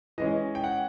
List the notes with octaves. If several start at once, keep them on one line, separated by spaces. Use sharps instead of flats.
E3 G#3 C#4 D#5
G5
F#5